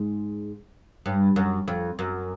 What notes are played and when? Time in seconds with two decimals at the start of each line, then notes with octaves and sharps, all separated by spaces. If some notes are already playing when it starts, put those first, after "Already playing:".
Already playing: G#2
1.06 G2
1.36 F#2
1.68 F2
1.99 F#2